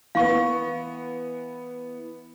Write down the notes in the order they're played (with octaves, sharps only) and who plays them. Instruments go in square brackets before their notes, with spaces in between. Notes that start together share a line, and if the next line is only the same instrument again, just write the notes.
[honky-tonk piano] E3 B3 [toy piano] F5 C#6